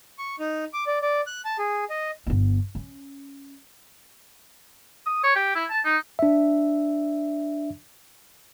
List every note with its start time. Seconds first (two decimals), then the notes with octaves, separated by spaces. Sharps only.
0.19 C#6
0.39 D#4
0.74 D6
0.87 D5
1.02 D5
1.27 F#6
1.45 A5
1.59 G#4
1.90 D#5
2.27 G1 B3
2.75 C#4
5.06 D#6
5.24 C#5
5.36 G4
5.55 E4
5.70 A5
5.85 D#4
6.19 D4 E5